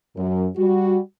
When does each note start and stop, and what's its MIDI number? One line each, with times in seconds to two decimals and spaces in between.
0.16 0.47 42
0.57 0.98 55
0.57 0.98 66